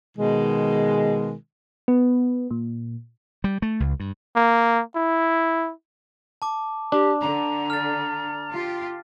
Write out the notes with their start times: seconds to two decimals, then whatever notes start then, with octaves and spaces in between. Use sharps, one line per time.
0.16 B2 D#3 G#3
1.88 B3
2.51 A#2
3.44 G3
3.62 A3
3.80 C#2
4.00 G2
4.36 A#3
4.95 E4
6.42 A5 D6
6.92 D4 G4
7.21 D3 A#5
7.70 F6 A6
8.52 F4 G4